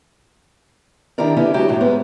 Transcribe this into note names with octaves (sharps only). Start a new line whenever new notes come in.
D#3 D4 E4 G4 A#4 D5
D3 B3 C#4 E4 G4
F#3 G#3 E4 F#4 G4
F#2 A2 F#3
G#2 G#3 B3 C#4